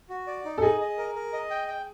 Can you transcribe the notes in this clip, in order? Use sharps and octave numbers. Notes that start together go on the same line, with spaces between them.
F#4
D5
D#4
A4
G#4 D#5
D#5
A#4
A#4
D#5
G5
G5